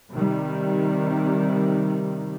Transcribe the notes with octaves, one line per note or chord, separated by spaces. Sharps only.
C3 D#3 G3